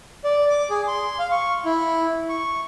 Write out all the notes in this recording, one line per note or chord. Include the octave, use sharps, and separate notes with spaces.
D5
D6
G#4
C6
F5
C#6
E4
C#6